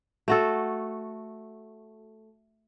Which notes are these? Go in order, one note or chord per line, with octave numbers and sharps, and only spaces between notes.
A3 F#4 A4